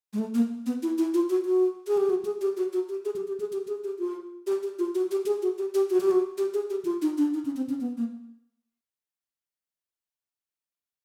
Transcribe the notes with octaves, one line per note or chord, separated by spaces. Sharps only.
G#3
A3
A#3
B3
E4
E4
F4
F#4
F#4
G#4
G4
F#4
G#4
G4
F#4
F#4
G4
G#4
G4
G4
G#4
G4
G#4
G4
F4
G4
G4
F4
F#4
G4
G#4
F#4
G4
G4
F#4
G4
F#4
G4
G#4
G4
F4
D#4
D4
D#4
C#4
C4
C#4
B3
A#3